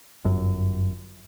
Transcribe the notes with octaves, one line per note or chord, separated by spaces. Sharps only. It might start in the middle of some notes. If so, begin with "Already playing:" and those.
G1 F#2